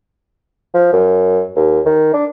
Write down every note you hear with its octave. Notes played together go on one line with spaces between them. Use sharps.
F3
F#2
D#2
D#3
D4